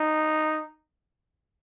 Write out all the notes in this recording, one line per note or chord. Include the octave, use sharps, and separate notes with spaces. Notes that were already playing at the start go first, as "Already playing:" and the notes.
Already playing: D#4